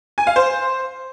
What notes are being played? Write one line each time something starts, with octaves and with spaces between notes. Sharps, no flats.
G#5
F5
C5